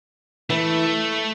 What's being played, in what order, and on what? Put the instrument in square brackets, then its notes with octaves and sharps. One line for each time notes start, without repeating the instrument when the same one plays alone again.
[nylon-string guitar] E3 [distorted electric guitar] A3